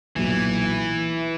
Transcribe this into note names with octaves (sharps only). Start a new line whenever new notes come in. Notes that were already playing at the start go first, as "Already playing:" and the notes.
B1 A#2 E3 F#3